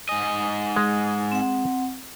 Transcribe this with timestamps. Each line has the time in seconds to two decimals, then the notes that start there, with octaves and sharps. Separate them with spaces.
0.09 G#2 D#5 G#5
0.76 G#3
1.32 C4 F#5